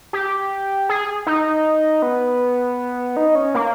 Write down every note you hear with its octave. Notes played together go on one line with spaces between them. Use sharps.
G4
G#4
D#4
B3
D#4
C#4
A#3